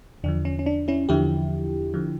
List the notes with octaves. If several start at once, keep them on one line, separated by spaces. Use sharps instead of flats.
E2 D3 F3 D4
C#4
C#4
D4
C#4 E4
E2 D3 F3 E4 G4
D3 F3